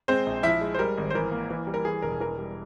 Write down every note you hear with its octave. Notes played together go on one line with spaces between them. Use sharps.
G#3 C4 C5
A#1
F3 E4 E5
G#3
C5
G3 A#4
G#1
C5
E3 A#4
A#3
E3
G3
A#4
E3 G#4
E1 A#4
E3 A#4
G3